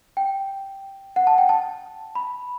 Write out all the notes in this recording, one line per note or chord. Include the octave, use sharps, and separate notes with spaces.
G5
F#5
A5
G5
A5
B5